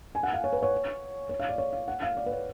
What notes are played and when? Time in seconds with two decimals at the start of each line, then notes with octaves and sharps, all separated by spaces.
0.15 G#5
0.23 F#5
0.33 F5
0.44 C#5
0.53 B4
0.63 C#5
1.29 C#5
1.40 F5
1.49 D5
1.58 C#5
1.73 F5
1.88 F#5
2.02 F5
2.17 D5
2.26 B4
2.31 C#5